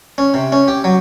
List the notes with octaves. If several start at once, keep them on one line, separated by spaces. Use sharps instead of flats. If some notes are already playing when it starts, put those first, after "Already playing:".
C#4
C3
C#4
G4
F#3